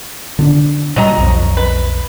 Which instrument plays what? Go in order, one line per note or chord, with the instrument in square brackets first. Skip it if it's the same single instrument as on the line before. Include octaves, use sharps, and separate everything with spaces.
[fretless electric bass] D3 C#4 D4
[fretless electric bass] A#2 G3 [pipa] F#3 D#5 A#5
[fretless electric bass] B1 F2
[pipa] B4